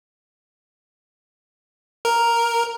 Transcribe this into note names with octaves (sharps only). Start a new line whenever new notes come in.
A#4